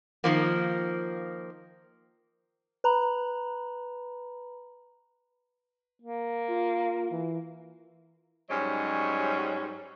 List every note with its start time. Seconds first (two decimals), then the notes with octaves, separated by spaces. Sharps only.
0.24 D#3 F3 A#3
2.84 B4 A#5 B5
6.02 A#3
6.50 F4
7.11 E3
8.50 G#2 F#3 G3 C#4 D#5